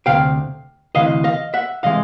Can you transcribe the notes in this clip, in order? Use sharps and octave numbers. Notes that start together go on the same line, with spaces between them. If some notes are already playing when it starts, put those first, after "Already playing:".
D2 C3 F5 G5
D2 C3 E3 D#5 F5
D#5 F5
E5 F#5
C3 E3 G#3 D#5 F5